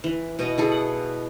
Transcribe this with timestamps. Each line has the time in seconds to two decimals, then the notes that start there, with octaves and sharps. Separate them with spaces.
0.04 E3
0.39 B2 B3 D#5
0.58 E4 G#4 A4
0.72 F#5